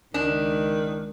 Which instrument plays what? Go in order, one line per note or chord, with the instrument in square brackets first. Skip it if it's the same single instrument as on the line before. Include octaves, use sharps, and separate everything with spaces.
[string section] C#2 [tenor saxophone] D#3 [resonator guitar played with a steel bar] D4